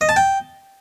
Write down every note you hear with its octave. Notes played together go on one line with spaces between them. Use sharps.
D#5
A5
G5